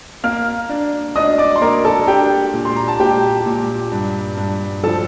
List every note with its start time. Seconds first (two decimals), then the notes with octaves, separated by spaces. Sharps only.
0.24 A#3 F5 F6
0.69 D4
1.16 D4 D#5 D#6
1.38 D5 D6
1.56 C6
1.61 A#3 A#4 A#5
1.85 A4 A5
2.07 D4 G4 G5
2.54 A#2
2.65 C6
2.76 A#5
2.88 A5
3.00 A#2 G4 G5
3.46 A#2
3.92 G2
4.37 G2
4.84 F3 A4 A5